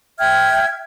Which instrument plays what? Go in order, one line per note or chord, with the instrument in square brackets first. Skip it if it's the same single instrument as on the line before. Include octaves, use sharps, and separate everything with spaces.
[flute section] E5 G5 F6 G#6